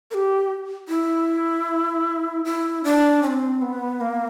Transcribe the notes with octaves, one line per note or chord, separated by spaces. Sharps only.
A#4
G4
E4
E4
D4
C#4
C4
B3
A#3